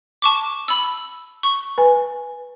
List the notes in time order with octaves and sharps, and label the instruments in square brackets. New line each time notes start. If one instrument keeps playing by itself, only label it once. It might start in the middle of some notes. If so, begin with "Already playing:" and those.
[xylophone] A5 C#6 D6
B5 E6
C#6
[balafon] B4 G#5